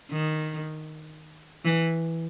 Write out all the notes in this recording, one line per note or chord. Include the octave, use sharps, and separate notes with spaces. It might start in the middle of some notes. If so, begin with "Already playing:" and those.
D#3
E3